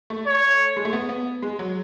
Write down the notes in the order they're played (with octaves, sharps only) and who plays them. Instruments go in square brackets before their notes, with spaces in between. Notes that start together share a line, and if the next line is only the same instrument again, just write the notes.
[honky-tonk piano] A3
[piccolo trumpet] C#5
[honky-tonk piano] G#3
A3
B3
B3
G#3
F#3